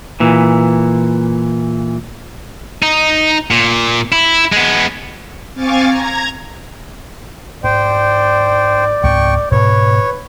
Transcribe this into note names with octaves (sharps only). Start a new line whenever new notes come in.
A#2 E3
D#4
A#2
E4
G#3 B3
C4 F5 G#5 C#6 D6 A6
A#5 G#6
G#2 C5 D5 G5
C#2 G#2 C4 G5 C#6
G#2 B2 B4 C#5